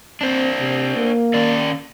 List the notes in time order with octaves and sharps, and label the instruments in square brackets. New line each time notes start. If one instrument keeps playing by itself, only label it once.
[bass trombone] C4 [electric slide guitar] D4 C5
[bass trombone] C3
A#3
[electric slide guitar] D#3 C#4 D5